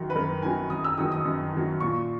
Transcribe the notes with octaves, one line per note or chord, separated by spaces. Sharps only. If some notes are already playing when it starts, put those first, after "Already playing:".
Already playing: F#2 D#3 F#3
B4
F#2 A#4
D#3 F#3 G#5
F#2 D#6
E6
D#3 F#3 D#6
D#6
F#2
D#3 F#3
A#2 C#6